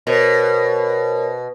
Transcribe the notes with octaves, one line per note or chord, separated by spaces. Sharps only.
B2 A#4 C5 C#5